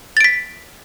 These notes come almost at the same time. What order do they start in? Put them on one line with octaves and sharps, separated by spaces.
A6 D7 B6